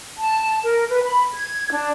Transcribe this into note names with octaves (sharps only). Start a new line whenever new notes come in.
A5
A#4
B4
B5
G#6
D4